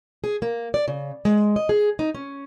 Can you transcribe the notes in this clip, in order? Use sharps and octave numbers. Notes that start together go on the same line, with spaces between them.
G#4
A#3
D5
C#3
G#3
D#5
G#4
D#4
C#4